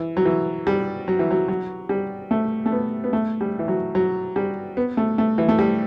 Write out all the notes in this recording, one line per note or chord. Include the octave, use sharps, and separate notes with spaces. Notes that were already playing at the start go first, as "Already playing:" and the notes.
Already playing: E3
F#3
E3
G3
F#3
E3
F#3
F#3
G3
A3
A3
B3
B3
A3
G3
E3
F#3
F#3
G3
B3
A3
A3
E3
A3
G3